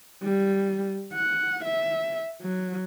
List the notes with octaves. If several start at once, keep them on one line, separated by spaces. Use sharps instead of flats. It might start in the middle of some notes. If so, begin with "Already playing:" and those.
G3
F#5
E5
F#3